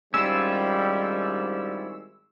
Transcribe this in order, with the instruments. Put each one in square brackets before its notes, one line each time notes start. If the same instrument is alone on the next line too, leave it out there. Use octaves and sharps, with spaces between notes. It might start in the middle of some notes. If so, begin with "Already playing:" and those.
[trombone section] G#1 G#2 G3 [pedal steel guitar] C#4 E4 F4 [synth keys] E6